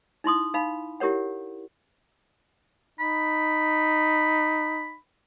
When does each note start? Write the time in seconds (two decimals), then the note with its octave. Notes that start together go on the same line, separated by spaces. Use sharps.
0.24 D#4 E4 C6 D#6
0.54 D#4 F5 B5
1.00 E4 G4 A#4 C#5 F#5
3.00 D#4 B5